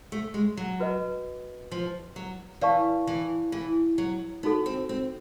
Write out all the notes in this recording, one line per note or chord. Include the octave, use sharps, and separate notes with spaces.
A3
G#3
F#3
F#4 B4 D#5
F3
F#3
E3 B4 D5 F5 A5 C#6
E3
E3
F#3
B3 D#4 F#4 A4
C4
C4